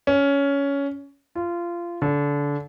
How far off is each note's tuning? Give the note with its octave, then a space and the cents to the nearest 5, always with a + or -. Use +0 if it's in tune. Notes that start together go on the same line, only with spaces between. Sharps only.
C#4 +15
F4 -20
D3 -25